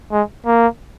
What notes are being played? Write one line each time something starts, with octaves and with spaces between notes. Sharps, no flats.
G#3
A#3